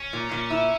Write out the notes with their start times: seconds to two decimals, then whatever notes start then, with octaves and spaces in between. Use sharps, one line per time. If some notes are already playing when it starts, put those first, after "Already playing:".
Already playing: C#4
0.13 A#2
0.31 A#2
0.50 E4